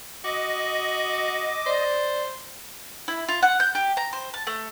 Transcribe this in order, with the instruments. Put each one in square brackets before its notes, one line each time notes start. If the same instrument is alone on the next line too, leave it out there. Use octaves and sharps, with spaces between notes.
[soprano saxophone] F#4 [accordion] D#5 [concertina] D6
[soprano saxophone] C5 [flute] D5
[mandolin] E4
F4
F#5
G6
G4
A#5
C5
A5
A3